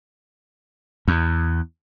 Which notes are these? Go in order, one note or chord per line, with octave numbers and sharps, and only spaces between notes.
E2